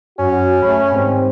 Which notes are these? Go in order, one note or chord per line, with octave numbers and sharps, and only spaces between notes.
F#2 C#4 F#4
A3 G#4 C#5 B5
G#2 D#3 G3 C4